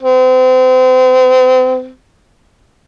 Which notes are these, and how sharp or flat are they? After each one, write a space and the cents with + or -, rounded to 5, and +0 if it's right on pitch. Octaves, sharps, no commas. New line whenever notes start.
C4 -35